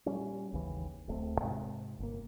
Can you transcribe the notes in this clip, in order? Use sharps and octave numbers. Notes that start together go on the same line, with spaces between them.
A#2 F#3 G3 C#4
G#1 D#2 C#3 E3
D1 A3 C4
G#2 C3
G1 A#3